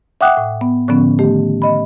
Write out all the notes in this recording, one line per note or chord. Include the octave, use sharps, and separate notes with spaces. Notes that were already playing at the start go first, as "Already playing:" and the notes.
E5 F#5 G5 D6 D#6 F#6
A2
B3
A2 D3 F3 B3 C#4
D#3 A3 G4
D#5 B5